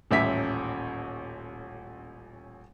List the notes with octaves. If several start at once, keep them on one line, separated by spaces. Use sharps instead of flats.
D#1 A1 C#4 E5 B6